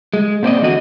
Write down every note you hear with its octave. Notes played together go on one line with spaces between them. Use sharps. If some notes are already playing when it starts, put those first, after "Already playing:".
G#3
A#2 C4 D5 D#5
E2 D3 F#4 D#5